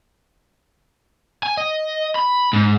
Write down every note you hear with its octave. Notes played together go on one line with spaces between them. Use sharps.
G#5
D#5
B5
G#2